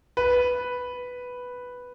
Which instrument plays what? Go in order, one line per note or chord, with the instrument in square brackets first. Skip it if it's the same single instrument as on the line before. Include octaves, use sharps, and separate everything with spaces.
[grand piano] B4